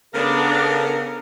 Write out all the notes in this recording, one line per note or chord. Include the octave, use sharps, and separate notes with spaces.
C#3 B3 D4 A4 A#4